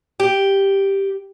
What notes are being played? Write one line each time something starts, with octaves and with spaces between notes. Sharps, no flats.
G4